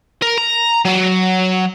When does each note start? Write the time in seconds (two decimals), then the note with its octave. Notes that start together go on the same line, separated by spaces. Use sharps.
0.22 A#4
0.38 A#5
0.85 F#3